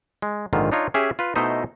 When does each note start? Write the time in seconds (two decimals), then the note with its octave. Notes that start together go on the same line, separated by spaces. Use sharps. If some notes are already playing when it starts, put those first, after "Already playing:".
0.22 G#3
0.53 A#1 G#2 D3 D#3 F4
0.72 D4 D#4 F4 C#5
0.94 C#4 G4 G#4 E5
1.19 F4 B4
1.36 B2 A3 D#4 E4 C5 D#5